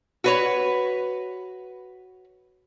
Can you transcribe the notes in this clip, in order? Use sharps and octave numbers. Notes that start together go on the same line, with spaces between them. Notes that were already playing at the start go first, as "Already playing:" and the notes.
F#4 B4 C#5